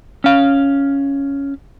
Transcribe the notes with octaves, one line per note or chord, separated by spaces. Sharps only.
C#4 F5